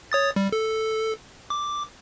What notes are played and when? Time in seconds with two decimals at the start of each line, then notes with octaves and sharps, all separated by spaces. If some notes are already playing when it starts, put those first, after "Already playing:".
0.12 C#5 D#6 A6
0.36 G3
0.52 A4
1.50 D6